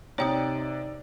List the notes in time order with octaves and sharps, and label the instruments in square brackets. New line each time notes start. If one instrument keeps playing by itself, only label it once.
[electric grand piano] C3 D5 [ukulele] D#4 [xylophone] C#5 G5 D#6